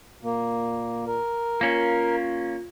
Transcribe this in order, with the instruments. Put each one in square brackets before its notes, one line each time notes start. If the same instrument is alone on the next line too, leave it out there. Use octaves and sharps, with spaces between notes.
[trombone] A#2 [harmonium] A#3
[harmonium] A#4
[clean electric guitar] A#3 C#4 [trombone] F4